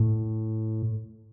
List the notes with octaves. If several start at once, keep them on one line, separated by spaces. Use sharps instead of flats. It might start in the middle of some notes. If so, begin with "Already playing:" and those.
Already playing: A2